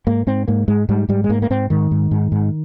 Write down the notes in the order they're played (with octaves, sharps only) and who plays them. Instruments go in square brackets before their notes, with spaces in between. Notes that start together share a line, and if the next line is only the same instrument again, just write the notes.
[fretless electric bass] G#2 A#3
G#2 C4
G#2 A#3
G#2 G#3
G#2 G3
G#2 G3
G#3
G#2 A#3
A#3
G#2 C4
G#2 D#3
G#2
G#2
G#2